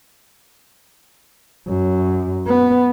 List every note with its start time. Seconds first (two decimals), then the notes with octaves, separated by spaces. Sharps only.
1.68 F#2
2.47 B3